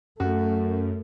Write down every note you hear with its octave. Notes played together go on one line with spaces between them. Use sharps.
F#2 A3 F#4